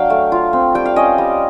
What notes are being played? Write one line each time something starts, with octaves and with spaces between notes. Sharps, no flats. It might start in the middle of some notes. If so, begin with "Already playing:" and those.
Already playing: F#3 D4 F5 G5
A3
F4
C4
G3 G5
F5
C#4 D#5
G3